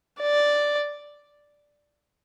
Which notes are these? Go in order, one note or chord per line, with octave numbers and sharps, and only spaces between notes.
D5